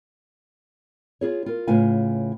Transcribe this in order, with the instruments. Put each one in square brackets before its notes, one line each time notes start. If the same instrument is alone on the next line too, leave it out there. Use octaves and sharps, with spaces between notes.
[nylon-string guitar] F4 G#4 C#5
F4 A#4
A2 C#3 F4 B4 F5 G#5